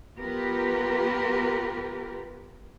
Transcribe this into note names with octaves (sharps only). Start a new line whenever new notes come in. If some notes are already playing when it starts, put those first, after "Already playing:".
B3 F4 G4 A#4 B4